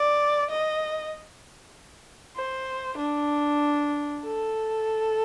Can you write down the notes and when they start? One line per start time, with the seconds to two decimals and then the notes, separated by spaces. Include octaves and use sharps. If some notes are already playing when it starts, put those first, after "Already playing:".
Already playing: D5
0.50 D#5
2.36 C5
2.98 D4
4.23 A4